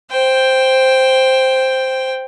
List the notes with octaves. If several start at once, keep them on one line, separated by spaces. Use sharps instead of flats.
C5 G5